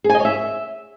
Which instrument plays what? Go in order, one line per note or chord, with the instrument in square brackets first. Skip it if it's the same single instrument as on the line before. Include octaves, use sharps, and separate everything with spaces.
[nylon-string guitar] G#4
G#5
D#5
C#5
E5